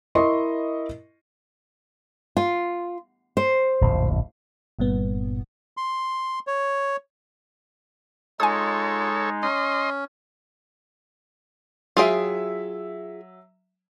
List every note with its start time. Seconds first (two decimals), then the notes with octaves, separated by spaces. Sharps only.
0.15 E4 A#4 D#5 C6 C#6
2.37 F4
3.37 C5
3.81 D1 A#1 F2
4.79 G1 G2 A#2 B3
5.77 C6
6.47 C#5
8.40 G#3 D#4 F4 A4 C#5 G#5 D#6
9.43 C#4 D#5 C6
11.97 F#3 F4 G#4 E5 G5